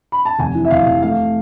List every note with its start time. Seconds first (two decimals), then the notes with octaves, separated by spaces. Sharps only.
0.12 B5
0.25 A5
0.39 F1 G#5
0.55 E3
0.65 E5
0.71 F1 F5
0.86 F1
1.03 A3 F5